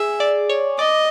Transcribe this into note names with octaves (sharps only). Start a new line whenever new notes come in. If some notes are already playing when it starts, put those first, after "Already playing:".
Already playing: G#4 E5
D5
C#5
D5 D#5